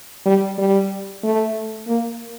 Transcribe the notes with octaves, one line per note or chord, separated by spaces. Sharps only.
G3
G3
A3
A#3